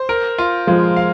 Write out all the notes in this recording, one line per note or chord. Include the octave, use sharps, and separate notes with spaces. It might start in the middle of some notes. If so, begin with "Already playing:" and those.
Already playing: C5
A#4
F4
F3 G#3
F5